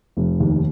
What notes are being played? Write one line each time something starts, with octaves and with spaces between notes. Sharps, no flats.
F1
D#2